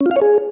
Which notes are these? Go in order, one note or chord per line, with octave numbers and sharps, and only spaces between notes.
C#4
F4
F5
C#5
G#4